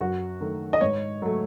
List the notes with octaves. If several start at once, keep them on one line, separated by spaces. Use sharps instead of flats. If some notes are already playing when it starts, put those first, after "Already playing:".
F#2 F#4
D#3 F#3 A3
D#5
G#2 C#5
F#3 A3